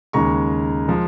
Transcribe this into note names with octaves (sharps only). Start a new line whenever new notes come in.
D#2 C#3 G#3 A#5 C#6
F3 G#3